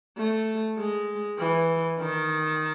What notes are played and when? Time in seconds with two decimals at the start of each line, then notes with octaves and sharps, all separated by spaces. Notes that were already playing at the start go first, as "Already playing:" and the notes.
0.17 A3
0.77 G#3
1.39 E3
1.98 D#3